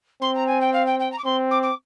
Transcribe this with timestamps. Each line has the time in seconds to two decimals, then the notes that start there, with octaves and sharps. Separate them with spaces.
0.21 C4 C6
0.35 A#5
0.47 G#5
0.61 G5
0.73 F5
0.86 G5
0.99 G5
1.12 A#5
1.18 D6
1.24 C4 C6
1.50 D6
1.62 D6